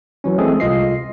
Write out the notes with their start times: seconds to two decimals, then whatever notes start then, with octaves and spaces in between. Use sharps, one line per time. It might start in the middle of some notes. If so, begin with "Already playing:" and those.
0.24 E3 F#3 C#4
0.38 G#3 A3 C4 G#4 A4
0.60 C2 F4 D#5 C7